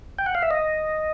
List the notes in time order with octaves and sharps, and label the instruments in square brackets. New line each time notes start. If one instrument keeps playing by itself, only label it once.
[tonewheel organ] G5
F#5
F5
E5
D#5